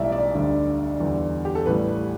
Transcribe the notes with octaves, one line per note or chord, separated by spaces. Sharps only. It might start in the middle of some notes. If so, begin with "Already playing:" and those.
Already playing: B1 A2 E3 G3 D5 E5
D5
D2 D3 G3
E2 D3 G3
G4
A4
A1 A2 G3 B4